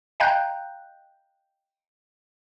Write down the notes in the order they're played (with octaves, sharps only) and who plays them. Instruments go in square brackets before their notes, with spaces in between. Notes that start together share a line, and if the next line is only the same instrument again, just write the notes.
[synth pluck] D#5 F5 G5 A#5 F#6 G6